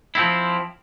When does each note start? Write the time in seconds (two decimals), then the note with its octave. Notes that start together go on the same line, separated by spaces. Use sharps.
0.15 F3 C4 E4